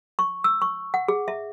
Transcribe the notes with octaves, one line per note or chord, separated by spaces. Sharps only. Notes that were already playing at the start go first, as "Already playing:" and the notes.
C#6
E6
C#6
F#5
G#4
E5